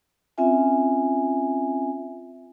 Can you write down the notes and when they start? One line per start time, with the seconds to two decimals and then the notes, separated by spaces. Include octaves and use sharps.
0.38 C4 C#4 F4 E5 G#5